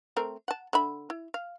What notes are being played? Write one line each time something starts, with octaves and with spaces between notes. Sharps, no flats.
A3 C4 A#4
F#5 A5
D3 E5 B5
E4
F5